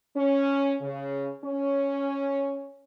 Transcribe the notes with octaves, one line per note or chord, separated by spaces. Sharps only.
C#4
C#3
C#4